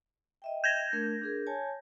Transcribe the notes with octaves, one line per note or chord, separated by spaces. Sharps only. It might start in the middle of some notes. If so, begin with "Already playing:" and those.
D#5 E5 G5
G6 G#6 A#6
A3 D4 A#4
D4 G#4 A#4
C#5 G#5 A5